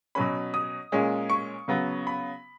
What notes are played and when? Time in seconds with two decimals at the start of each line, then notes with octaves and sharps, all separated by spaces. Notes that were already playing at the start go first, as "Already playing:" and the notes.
0.15 B2 F#3 C#4 B5
0.54 D#6
0.92 A#2 G#3 C#4
1.30 C#6
1.68 C#3 F#3 B3
2.07 B5